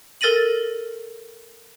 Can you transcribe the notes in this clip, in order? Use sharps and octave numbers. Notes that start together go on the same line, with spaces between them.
A4 A#4 A6 A#6 D#7 F#7